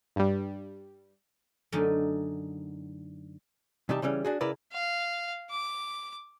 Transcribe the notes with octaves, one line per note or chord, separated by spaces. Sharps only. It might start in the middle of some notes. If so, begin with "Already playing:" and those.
G2 G3
F#2 D3 A3 D#4
C3 E3 G3 D#4 G4 A5
C#3 E3 G3 C#4
D4 F#4 G#4
C#3 E4 A#4 B4 D5
F5
D6